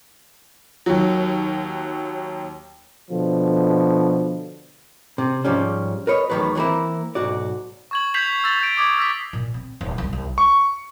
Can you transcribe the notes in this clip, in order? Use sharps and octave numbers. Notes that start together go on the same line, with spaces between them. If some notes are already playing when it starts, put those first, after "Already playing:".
D#2 F#3
B2 D3 F3
C3
G#2 F3 G3 C#4
A#4 B4 C#5 D#5
E2 A2 C3 D#3 F#3 B4
E3 G3 A#3 C4 E4
B1 G#2 F#4 D5
C#6 G#6 F#7
G6 G#6 B6 C7 F7 F#7
E6 A6 F#7
G6 D7
D6 D#6 G#6
E6 A#6 B6
A#2
C4
D#1
C2
C2
C#6